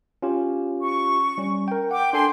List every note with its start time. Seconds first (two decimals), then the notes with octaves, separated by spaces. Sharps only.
0.22 C#4 F4 G4
0.82 C#6
1.38 G3 C#4
1.68 A#4 G5
1.91 F#5 G5 D6
2.13 D4 A4 G5 G#5 C6